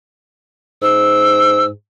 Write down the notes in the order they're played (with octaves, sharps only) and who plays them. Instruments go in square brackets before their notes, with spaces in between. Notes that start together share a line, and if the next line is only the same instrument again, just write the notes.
[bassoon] G#2 [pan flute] E6